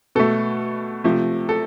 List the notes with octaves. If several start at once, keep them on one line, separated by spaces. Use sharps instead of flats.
B2 A3 A4
C3 F3 A3
A4